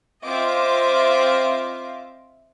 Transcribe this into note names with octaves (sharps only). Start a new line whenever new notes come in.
C4 F4 D#5 E5 D6